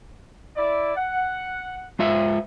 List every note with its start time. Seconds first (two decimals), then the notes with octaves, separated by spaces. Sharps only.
0.57 E4 D5
0.96 F#5
1.99 G#3 F4 E5